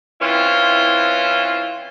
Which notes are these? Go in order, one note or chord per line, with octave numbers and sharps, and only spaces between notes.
E3 C4 C#4 E4 F4